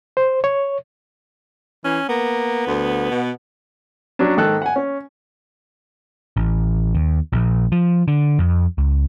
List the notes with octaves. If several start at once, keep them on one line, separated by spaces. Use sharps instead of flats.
C5
C#5
E3 C#4
A#3 B3
D2
B2
F#3 C#4 D4
G#2 D#3 A4 F#6
F#5 G#5
C#4
A1
D#2
A#1
F3
D3
F2
C#2